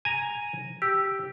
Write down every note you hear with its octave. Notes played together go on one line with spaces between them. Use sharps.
G#5 A#5
G4 E6